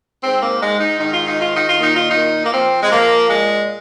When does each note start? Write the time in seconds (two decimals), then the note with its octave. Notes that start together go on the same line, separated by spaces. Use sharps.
0.23 G#2 C4
0.42 A#3
0.62 G#2 G#3
0.80 D#4
1.00 D#3 D#4
1.14 F4
1.28 D#4
1.38 D#3 F4
1.55 D#4
1.69 F4
1.77 A#2
1.83 D#4
1.97 F4
2.11 A#2 D#4
2.46 A#3
2.53 F3 C4
2.83 G#3
2.91 F3 A#3
3.30 A#2 G#3